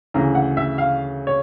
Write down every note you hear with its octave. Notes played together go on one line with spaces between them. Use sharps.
D2 C#3 E3 A#5
F#5
E5
F5
C#5